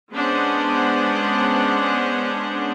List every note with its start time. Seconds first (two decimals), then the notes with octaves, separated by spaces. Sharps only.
0.13 G#3 B3 C#4 D4 C5 F#5